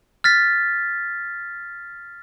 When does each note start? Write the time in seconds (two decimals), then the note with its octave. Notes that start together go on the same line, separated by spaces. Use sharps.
0.24 F6 A6 B6